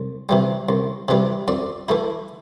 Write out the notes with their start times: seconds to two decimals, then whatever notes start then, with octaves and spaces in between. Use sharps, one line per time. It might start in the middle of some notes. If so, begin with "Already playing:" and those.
Already playing: C2
0.29 C3 E3 G3
0.69 C2
1.08 C3 E3 G3
1.48 F2 D5
1.89 E3 A3 E4